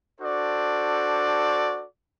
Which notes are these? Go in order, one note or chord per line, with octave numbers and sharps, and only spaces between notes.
D4 F#4 A4 C5 D5